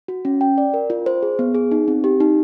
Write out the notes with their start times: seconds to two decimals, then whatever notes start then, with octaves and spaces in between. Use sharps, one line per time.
0.08 F#4
0.25 C#4
0.41 G5
0.58 D5
0.74 A#4
0.90 F4
1.06 C5
1.23 G#4
1.39 B3
1.54 G#4
1.71 D#4
1.88 C4
2.04 G4
2.20 D#4